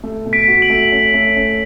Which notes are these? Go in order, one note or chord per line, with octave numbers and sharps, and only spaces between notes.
A3
B2
B6 D7
F#4
D7 F#7
A3
C#4
A3
C#4